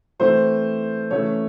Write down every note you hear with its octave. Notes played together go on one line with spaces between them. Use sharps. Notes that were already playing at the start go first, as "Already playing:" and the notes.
E3 A3 C4 C5
E3 A3 C#4 C#5